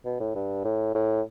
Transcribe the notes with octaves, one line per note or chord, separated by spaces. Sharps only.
B2
A2
G2
A2
A2